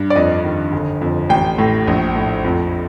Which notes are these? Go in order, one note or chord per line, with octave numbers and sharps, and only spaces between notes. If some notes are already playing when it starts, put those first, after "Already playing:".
Already playing: G2
D5
F2 D#5
D#3
G1
F2
A1 G5
A2
A#1
A2
F2